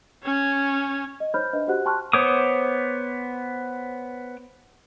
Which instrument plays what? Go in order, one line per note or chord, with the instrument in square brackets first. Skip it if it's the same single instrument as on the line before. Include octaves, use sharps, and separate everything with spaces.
[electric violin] C#4 C#5
[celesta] D#5
D#4 C5 C#5 B5 F6 G6
D4 B4 D#5 E5
F#4 G4 C5 F#5 F#6
G5 A5 C6 C#6 F6 F#6
[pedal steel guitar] B3 C5 C#5 D6 D#6